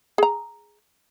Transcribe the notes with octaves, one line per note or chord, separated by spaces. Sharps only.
G#4 A#5